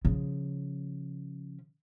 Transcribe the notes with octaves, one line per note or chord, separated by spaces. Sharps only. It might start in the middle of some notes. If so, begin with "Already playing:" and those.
C#3 F3